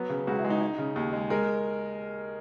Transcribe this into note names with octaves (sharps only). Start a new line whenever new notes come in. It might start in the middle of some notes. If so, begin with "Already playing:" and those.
Already playing: F#3 B3
C#3
C#2 F#4
E4
G#3
D#4
D#4
C#3
D#2
G#3
G#3 A#4